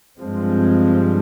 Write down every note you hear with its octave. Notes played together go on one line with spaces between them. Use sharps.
G2 F3 G#3 C4